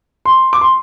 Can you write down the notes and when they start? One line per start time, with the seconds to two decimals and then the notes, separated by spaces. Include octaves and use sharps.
0.25 C6
0.53 D6
0.61 C6